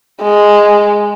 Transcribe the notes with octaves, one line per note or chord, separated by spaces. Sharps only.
G#3